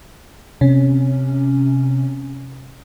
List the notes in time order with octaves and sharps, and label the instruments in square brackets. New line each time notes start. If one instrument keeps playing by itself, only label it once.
[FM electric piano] C3 C#4